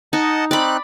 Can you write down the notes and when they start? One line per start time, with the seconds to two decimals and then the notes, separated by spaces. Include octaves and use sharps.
0.13 D#4 D#5 F#5 A5
0.51 C4 D#4 D5 B5 F#6